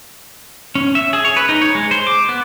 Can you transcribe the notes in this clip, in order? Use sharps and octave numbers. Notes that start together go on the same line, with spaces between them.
C#4
E5
G#4
C#5
B4
D#4
C#5
G#3
C5
D6
B3